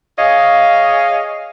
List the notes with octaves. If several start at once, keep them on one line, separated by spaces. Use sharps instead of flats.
G#4 C#5 D#5 F5